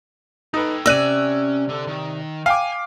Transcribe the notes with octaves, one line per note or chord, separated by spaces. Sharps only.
D#4 A4 B4 G5
C3 C#4 D5 E6 F#6 D#7
D3
D#3
F5 G5 G#5 D6